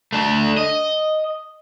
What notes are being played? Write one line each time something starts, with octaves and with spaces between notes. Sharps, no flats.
A3 D4
D#5